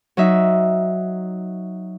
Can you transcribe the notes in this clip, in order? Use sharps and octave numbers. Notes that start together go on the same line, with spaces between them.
F#3 D#4 E5